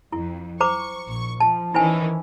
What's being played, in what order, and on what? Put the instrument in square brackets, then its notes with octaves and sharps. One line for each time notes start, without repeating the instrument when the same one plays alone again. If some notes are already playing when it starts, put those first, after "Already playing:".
[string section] F2 [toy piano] E4
[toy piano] C5 A#5 D6 [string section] C#6
[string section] A#1 C#6
[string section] F3 [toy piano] A5
[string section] D#3 E3 C#4 [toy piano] E4 C5 G#5